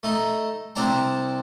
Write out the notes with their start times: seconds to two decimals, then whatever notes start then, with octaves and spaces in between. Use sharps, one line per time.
0.03 A3 D#4
0.76 C2 C4 D4 A5 A#5